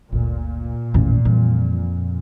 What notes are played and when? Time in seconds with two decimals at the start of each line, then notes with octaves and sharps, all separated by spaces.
0.12 G1 D2 A#2
0.94 A1 E2 D#3
1.25 F2 E3 G3